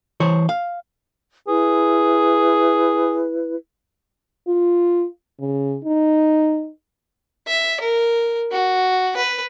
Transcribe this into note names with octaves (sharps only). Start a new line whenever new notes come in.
E3 C5 C#5
F5
E4 G#4 B4
F4
C#3
D#4
E5
A#4
F#4
B4